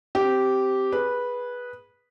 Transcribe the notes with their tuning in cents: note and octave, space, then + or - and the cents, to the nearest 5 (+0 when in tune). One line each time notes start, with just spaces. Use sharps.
C4 +0 G4 -10
G#4 +0 B4 -10